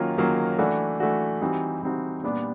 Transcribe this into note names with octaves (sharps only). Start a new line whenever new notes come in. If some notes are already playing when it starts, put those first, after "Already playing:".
Already playing: D#3 F#3 A#3 C#4 F4
D#3 F#3 A#3 C#4 F4
E3 A3 D4 F#4
E3 A3 D4 F#4
E3 G3 C4 D#4 F#4
E3 G3 C4 D#4 F#4
A#2 G3 B3 D4 G4